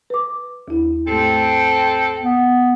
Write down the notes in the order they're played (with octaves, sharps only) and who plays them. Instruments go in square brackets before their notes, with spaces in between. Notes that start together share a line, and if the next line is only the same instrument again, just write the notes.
[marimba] B4 D6
D#2 E4
[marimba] G#2 A3 [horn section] C4 A4 G5
[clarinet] B3